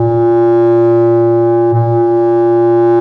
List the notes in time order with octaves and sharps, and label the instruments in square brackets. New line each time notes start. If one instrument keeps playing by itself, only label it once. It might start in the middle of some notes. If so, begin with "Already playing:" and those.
Already playing: [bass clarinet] A#2
A#2